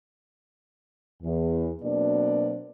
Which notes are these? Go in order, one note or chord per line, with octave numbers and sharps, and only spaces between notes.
E2
B2 F#3 A#3 C4 D4 D5